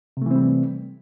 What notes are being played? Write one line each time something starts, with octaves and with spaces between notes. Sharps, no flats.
C3 E3 G3 A3 C4